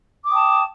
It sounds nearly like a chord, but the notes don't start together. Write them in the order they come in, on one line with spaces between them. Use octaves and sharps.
D6 D#6 G5 A5